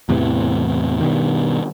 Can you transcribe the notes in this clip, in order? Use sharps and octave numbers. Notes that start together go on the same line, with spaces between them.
E2 A2 C3 E3
G2 B2 D#3